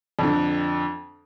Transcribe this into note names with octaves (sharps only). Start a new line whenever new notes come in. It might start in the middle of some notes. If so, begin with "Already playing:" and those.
F2 D3